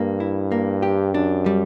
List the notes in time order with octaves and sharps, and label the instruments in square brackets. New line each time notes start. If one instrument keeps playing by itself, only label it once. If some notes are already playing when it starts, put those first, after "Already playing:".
Already playing: [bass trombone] G2 [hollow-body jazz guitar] A#3
[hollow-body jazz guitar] E4
A#3
G4
[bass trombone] F#2 [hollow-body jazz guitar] D4
[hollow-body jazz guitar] G3